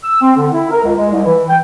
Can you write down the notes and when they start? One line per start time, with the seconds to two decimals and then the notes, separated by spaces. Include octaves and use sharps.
0.04 E6
0.21 C4
0.37 D3
0.53 E4
0.71 A#4
0.83 C#2
0.97 G#3
1.10 C2
1.24 E3
1.49 G5